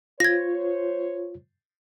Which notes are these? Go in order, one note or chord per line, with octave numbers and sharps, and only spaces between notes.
F4 C5 C#5 G#6 A#6